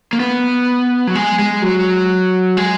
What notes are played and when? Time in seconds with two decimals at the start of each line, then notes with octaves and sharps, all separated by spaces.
0.13 A#3
0.20 B3
1.07 F#3
1.15 G#3
1.39 G#3
1.62 F#3
2.57 G#3